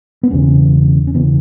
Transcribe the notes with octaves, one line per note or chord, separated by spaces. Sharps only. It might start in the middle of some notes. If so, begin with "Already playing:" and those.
B3
E1 E2 C#3 C#4
C#4
E1 E2 C#3 B3